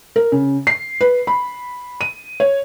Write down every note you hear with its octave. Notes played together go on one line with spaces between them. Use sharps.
A#4
C#3
C7
B4
B5
D#7
C#5